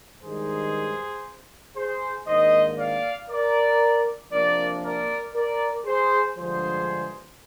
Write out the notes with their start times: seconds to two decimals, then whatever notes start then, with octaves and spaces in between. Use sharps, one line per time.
0.22 G2 D#3 G#3 D#4 G#4 C5
1.76 G#4 C5
2.27 G#2 D#3 A#3 D4 C5 D#5
2.78 D5 F5
3.30 A#4 D5
4.32 C3 F3 A#3 D4 A#4 D5
4.84 A#4 D5
5.35 A#4 D5
5.86 G#4 C5
6.37 G2 D3 F3 G#3 G#4 C5